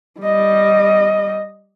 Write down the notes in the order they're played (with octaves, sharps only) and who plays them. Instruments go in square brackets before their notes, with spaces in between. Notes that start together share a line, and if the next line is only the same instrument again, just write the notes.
[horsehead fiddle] G3 D#5